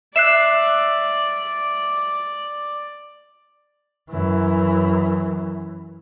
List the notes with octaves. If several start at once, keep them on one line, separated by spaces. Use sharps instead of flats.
D5 E5 F#6 C7 E7
F#2 E3